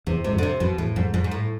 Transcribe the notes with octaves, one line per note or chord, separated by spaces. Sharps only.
E2 C3
G#2 C3
F2
D3
C3
F2 B2
E2 A2
F2 G#2
F2 G#2
G#2
A2